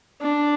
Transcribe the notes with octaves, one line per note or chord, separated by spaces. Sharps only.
D4